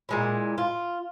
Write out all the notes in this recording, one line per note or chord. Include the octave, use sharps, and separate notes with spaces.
A#2 G#3 E4
F4